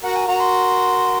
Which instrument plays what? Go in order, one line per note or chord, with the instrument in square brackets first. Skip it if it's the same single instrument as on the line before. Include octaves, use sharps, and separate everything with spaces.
[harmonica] F#4 A#4 [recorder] F#5
[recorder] G#5
[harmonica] F#4 A#4 [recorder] A#5
[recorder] C6